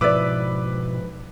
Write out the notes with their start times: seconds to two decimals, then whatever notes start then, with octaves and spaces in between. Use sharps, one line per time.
0.01 G#2 B2 F3 E4 B4 D5 D6